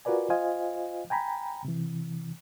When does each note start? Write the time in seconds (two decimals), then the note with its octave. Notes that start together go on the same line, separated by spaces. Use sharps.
0.05 F4 F#4 A#4 B4 D5 G#5
0.30 F4 C5 D#5 F5 G#5
1.10 G5 G#5 A#5 B5
1.65 C3 E3